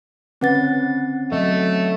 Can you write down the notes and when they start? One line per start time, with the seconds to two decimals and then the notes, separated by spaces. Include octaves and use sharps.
0.41 D3 C4 C#4 B4 F#5 A6
1.32 F#3 A3 D#5